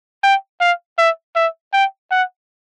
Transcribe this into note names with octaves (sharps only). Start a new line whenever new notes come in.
G5
F5
E5
E5
G5
F#5